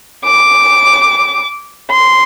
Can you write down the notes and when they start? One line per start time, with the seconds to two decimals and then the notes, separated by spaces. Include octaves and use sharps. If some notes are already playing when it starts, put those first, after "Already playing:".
0.25 D6
1.91 C6